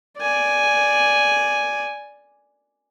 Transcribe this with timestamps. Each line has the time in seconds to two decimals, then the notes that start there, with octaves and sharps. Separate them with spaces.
0.18 D5 G#5